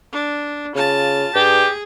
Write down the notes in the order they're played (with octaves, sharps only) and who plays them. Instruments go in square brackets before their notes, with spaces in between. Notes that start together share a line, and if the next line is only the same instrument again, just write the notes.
[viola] D4
[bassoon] C#3 [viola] F4 A5
[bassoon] G2 [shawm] G4 [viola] G#4